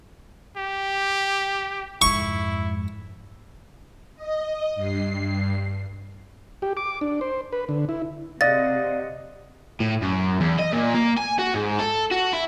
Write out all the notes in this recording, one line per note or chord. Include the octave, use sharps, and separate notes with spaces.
G4
F2 G#2 E4 C#6
D#5
G2 C7
G4
D6
D4
C5
B4
D3
E4
C3 D5 D#5 F5 F#5 A6
A2
F#2
E2
D#5
A#2
A#3
G#5
F#4
G#2
A4
F#4
E4